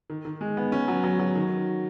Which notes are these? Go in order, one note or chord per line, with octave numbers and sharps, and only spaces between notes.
D#3
D#3
G#3
B3
C#4
F#3
F#3
F#3
D#3